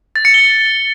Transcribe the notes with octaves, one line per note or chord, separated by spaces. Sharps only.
A6
C#7
G7